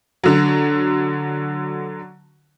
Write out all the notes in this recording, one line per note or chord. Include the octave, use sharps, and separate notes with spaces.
D3 F#3